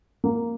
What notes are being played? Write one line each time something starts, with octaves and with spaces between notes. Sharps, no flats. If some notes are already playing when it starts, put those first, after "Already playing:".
A#3